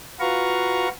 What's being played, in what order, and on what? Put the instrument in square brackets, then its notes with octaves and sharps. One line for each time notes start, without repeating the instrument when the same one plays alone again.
[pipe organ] F4 F#4 B4 F5 A#5 C#6